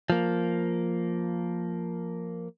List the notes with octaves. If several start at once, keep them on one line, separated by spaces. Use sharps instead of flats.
F3 A#3